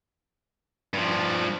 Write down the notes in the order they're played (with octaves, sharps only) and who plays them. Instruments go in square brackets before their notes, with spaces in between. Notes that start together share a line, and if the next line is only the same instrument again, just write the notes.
[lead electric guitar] G2 F3